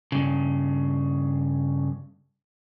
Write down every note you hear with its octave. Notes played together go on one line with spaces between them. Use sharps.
G2 C#3